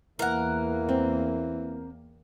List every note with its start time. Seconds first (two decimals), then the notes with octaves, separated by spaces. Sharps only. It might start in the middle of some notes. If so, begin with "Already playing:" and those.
0.19 E2 E3 A#3 A#4 F#5
0.89 C4